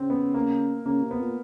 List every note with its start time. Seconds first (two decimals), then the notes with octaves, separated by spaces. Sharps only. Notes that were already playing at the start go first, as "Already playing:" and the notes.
Already playing: C#3 C4
0.10 B3
0.34 A#3
0.85 C#3 A#3
1.02 C3
1.11 B3
1.19 A#2